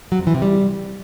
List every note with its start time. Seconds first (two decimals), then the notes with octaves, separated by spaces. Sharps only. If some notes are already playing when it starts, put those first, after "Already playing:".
0.12 F#3
0.19 F2
0.27 E3
0.34 C3
0.42 G3